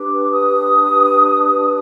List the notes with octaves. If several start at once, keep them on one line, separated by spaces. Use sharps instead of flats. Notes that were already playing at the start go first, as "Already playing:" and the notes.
Already playing: D4 G4 B4 D6
D#6